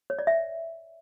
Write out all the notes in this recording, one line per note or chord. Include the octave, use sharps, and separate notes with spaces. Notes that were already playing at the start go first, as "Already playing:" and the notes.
C#5
D5
E5